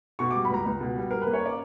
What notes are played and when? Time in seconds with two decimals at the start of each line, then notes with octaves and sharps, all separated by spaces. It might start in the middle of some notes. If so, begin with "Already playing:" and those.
0.19 B2 C#6
0.31 D6
0.35 G3
0.45 B5
0.50 C#2 A#5
0.66 C#2
0.81 B2
0.96 G3
1.11 G3 A#4
1.22 A#3 B4
1.33 C#5
1.42 C#4 D5